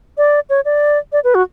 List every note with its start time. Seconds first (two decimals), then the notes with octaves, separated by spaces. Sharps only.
0.18 D5
0.50 C#5
0.65 D5
1.12 D5
1.24 B4
1.35 F#4